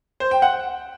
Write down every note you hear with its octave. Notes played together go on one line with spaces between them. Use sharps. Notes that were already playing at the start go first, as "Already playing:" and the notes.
C5
G5
F#5